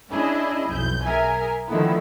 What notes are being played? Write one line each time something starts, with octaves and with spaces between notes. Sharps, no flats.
C#4 D4 E4 G#4 D#5
B1 F2 G6
G#4 A#4 E5 G#5
D3 D#3 F3 A3 B3 E4